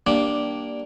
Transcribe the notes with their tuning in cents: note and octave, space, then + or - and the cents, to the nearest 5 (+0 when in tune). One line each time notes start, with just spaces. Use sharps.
G3 -10 A#3 +10 D4 +0